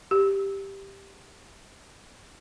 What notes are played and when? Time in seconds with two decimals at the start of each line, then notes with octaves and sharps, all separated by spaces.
0.11 G4